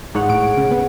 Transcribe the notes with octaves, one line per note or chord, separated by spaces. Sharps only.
G#2 G#4 C#5 F#5
A2 D7
C#3
B3